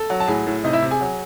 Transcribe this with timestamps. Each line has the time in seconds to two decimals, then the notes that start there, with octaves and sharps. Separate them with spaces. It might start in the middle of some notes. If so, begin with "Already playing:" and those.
Already playing: A4
0.10 F#3
0.20 A5
0.28 A2 G#4 G#5
0.47 A2
0.64 C3 D#4 D#5
0.73 E4 E5
0.82 C3
0.91 G#4 G#5
1.01 F#3